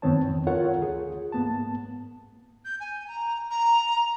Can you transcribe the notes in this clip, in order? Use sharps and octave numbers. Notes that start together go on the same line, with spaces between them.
F#2 D#3 B3 C4 C#5 A5
F2 D#3
F4 A4 A#4 C#5 F#5
D2 G#4
G#2 A#3 B3 A5
G6
G#5
A#5
A#5